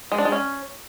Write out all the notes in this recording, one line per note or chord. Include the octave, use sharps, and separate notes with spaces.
G#3
D4
G#3
C#4